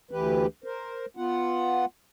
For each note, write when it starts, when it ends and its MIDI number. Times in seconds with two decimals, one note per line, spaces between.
0.11 0.47 38
0.11 0.47 52
0.11 0.47 67
0.11 0.47 71
0.64 1.06 70
0.64 1.06 72
1.17 1.85 59
1.17 1.85 65
1.17 1.85 78